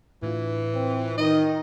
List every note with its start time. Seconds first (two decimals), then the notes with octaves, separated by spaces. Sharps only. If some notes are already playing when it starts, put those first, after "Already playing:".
0.23 A2 E3 D4 F4
0.74 C4
1.18 D#3 D#4 D#5